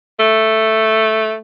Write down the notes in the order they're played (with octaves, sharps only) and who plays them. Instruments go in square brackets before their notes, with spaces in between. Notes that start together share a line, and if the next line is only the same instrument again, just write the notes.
[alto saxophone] A3